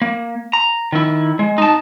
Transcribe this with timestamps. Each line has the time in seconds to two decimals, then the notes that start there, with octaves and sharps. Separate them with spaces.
0.02 A#3
0.53 A#5
0.93 D#3 E4
1.39 G#3
1.58 D#4 A5